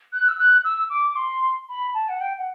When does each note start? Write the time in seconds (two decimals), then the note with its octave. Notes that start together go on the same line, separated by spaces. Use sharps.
0.13 F#6
0.28 E6
0.39 F#6
0.65 E6
0.90 D6
1.09 D6
1.16 C6
1.69 B5
1.94 A5
2.09 F#5
2.21 G5
2.38 F#5